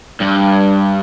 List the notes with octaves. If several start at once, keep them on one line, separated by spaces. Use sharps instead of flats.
G2